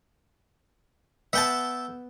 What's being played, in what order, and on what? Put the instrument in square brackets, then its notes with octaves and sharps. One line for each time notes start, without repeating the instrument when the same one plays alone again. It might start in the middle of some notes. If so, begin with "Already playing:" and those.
[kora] B3 F#5 [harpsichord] E5 G5 A5